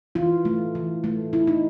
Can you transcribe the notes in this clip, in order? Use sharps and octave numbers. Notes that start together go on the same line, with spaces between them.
E3 F4
A3
E3
A3
E3 E4
D#4